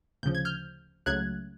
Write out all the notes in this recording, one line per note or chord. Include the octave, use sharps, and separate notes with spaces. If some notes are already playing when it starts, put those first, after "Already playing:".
D2 C#3 F3 G6
G#6
F6 G6
C#2 C#3 F#3 A3 F#6 G#6